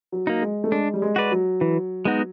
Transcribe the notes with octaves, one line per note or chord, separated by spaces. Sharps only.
F#3
A#3 D#4
G#3
A3
G#3 D4
G3
G#3
F#4 B4 D5
F#3
E3
G#3 B3 D#4 F#4